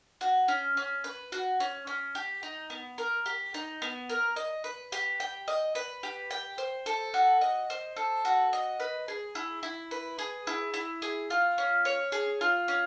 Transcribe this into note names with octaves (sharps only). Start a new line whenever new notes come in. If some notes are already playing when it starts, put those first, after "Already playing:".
F#4
C#4
C#4
B4
F#4
C#4
C#4
G4
D#4
B3
A#4
G4
D#4
B3
A#4
D#5
B4
G4
G5
D#5
B4
G4
G5
C5
A4
F#4
D#5
C5
A4
F#4
D#5
B4
G#4
E4
E4
B4
G#4
E4
E4
G#4
F4
C#4
C#5
G#4
F4
C#4